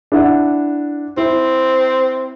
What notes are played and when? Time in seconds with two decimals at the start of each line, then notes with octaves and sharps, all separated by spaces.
0.12 D4 E4 F#5
1.17 C4 E4